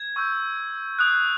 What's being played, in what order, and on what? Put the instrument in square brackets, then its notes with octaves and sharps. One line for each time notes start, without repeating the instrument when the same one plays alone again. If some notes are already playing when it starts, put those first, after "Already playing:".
Already playing: [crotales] G#6
C#6 E6 G6
D#6 F#6